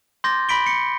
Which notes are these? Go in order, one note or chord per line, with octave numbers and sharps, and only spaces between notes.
C6 D6 G6 A6 A#6
B5 B6 D7 G7
C#7